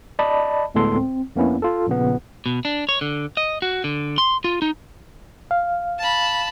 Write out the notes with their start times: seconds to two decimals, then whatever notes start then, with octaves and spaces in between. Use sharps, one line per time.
0.19 D5 D#5 A5 B5
0.75 D2 A2 G#3 B3 A4 C6
0.97 C4
1.36 F2 A#3 B3 C#4 E4
1.62 F4 A4
1.87 A#1 A#2 C#3 B3
2.46 B2
2.65 D4
2.89 C#5
3.01 D3
3.37 D#5
3.62 F#4
3.84 D3
4.18 C6
4.44 F4
4.62 D#4
5.51 F5
5.99 A5 B5